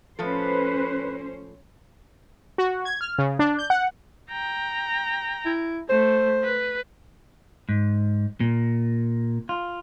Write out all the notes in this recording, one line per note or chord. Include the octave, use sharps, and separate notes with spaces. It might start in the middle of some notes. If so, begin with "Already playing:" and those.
A2 F3 C#4 A4 B4 C5
F#4
G#6
F6
C#3
D4
G6
F#5
G5 A#5
E4
A3 C5
B4
G#2
A#2
F4